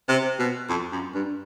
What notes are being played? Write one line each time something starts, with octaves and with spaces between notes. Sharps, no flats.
C3
B2
F2
F#2
G2